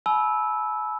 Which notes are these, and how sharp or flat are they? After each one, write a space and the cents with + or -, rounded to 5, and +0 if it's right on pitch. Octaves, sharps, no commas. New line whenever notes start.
G#5 +45 B5 -15 E6 -10